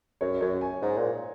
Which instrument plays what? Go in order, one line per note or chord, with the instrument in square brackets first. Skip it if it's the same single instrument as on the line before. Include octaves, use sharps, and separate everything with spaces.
[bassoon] F#2 [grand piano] C#5
[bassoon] F#2 [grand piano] C#5
[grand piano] G#5
[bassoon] G#2 [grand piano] A#5
[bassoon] A#2